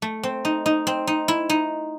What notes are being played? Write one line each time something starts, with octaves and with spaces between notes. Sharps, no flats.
A3
C4
D#4
D#4
C4
D#4
E4
D#4